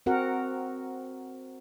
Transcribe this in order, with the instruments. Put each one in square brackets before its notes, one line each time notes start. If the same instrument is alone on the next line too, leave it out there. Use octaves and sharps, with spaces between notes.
[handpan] C4 F#4 A#4 F#5